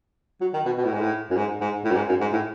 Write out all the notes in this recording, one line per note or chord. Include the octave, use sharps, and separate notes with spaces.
F#3
D#3
B2
B2
A2
G#2
A2
F#2
G#2
G#2
A2
F#2
G#2
F#2
G#2
A2